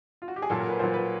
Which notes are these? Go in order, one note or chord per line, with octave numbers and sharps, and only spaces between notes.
F4
F#4
G4
G#4
A#2 F#3 A4
A#4
B4
A#2 F#3 C5
B4